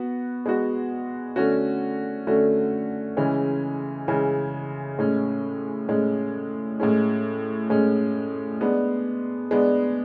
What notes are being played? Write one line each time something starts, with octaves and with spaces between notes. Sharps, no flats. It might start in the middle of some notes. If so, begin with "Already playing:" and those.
Already playing: B3 F#4
G#3 B3 F#4
D3 A3 C#4 F#4
D3 A3 C#4 F#4
C#3 E3 G#3 C#4
C#3 E3 G#3 C#4
A2 G#3 C#4
A2 G#3 C#4
A2 G#3 C#4
A2 G#3 C#4
G#3 B3 D4
G#3 B3 D4